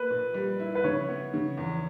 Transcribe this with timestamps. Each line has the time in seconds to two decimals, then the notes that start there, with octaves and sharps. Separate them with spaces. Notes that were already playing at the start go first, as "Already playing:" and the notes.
Already playing: A#3 B4
0.10 A#2
0.34 G3
0.60 E4
0.75 B4
0.84 C#3 C#5
1.09 B3
1.34 C#3
1.57 E2